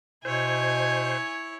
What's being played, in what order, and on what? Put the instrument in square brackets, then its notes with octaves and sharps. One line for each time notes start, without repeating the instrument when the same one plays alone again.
[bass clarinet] B2 [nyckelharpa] E4 C#5 [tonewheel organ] C5 [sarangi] G#5